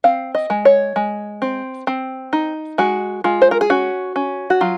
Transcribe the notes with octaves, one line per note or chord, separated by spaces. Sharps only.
C4 F5
D#5
G#3
C#5
G#3
C4
C4
D#4
G#3 F#4
G#3 F4
C5
A#4
G#4
C#4 F#4
C#4
F#4
F#3 F4